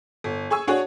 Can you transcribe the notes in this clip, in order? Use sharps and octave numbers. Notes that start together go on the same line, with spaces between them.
G1
G#4 G#5 C#6 E6
D4 F#4 G#4 C#5 F#5